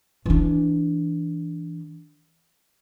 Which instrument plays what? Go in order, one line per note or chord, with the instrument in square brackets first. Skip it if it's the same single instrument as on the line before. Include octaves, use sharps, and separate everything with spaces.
[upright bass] E3 D4